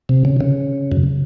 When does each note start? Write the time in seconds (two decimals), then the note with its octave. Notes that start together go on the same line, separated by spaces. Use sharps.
0.09 C3
0.25 C#3
0.41 C#3
0.92 F#2